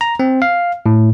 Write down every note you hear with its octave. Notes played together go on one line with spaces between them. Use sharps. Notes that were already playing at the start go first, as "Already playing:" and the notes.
A#5
C4
F5
A2